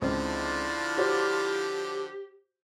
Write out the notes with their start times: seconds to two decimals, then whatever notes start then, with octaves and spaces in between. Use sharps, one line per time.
0.02 C#2 D3 F3 C4 D4 E4 F4 D5
0.97 F#4 G4 C5 C#5